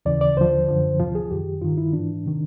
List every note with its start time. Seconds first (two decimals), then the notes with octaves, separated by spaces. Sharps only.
0.06 D#2 C#3 E3 D5
0.21 D5
0.37 D#2 D3 F3 C5
0.69 F#2 D3 F3
0.99 D2 C3 F3
1.15 G#4
1.31 F#2 D#3 G4
1.61 G2 D#3 F4
1.78 E4
1.93 G#2 E3 D4
2.26 C3 D#3